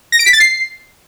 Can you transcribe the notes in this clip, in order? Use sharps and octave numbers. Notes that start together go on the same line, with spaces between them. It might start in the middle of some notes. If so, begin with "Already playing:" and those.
A#6
D7
B6
A6
C7